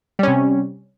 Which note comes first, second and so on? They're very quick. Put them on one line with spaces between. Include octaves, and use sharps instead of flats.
G3 C#4 C3